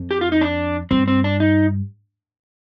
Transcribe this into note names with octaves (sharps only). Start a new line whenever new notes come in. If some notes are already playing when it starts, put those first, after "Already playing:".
Already playing: F2
G4
F4
D#4
D4
G2 C4
C4
D4
D#4